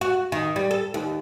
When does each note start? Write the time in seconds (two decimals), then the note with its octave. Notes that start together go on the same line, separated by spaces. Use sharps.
0.01 F#4
0.32 D#3
0.56 G3
0.71 A4
0.94 D#2